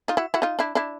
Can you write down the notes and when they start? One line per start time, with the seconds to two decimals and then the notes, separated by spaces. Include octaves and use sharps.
0.08 D#4 F4
0.17 E4 F#4
0.34 E4 F#4
0.42 D#4 F4
0.59 D4 E4
0.75 D4 E4